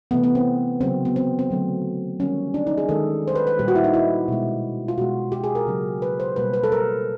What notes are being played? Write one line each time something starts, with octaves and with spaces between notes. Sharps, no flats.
C3 E3 A3 B3
B3
C4
C#3 F#3 A#3 C4
B3
C4
C4
D3 F#3 A3
D#3 G3 A#3 C#4
D4
D#4
G#4
D#3 G#3 A4
C5
B4
B4
A#2 G3 A#3 G4
F#4
E4
D#4
E4
B2 G#3
F4
B2 G#3 F#4
G4
G#4
A#4
C#3 F#3 A#3
B4
C5
B2 G3 A#3 B4
B4
A4
A#4